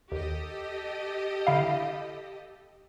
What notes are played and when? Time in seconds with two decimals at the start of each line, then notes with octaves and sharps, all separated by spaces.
0.12 D#2 G4 A4 D#5
1.47 D3 E4 F5